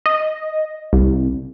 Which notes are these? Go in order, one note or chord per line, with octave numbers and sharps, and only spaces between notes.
D#5
C2